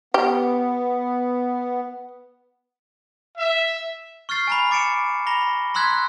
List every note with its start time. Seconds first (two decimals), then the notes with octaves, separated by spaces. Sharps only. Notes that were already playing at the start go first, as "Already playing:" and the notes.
0.14 B3 G4
3.38 E5
4.29 C#6 F6 G6 A6 C7
4.47 G#5 A#5 B5
4.71 D6 A6 C#7 D7 E7
5.27 A#5 B5 A#6 G7
5.74 A#5 C6 E6 F#6 G#6 B6